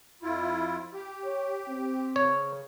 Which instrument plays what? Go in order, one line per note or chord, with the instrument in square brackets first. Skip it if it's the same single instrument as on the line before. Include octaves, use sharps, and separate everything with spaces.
[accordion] F2 E4 F4
G4
[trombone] C#5
C4
[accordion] C#3 [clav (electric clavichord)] C#5